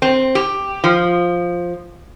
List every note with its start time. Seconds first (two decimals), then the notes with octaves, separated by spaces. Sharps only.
0.02 C4
0.35 G4
0.84 F3